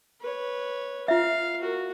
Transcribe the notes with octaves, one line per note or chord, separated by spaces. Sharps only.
B4 C#5
F4 E5 F5
F#4 A#4